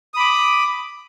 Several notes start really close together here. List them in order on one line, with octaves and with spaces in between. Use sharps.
D#6 B5 D6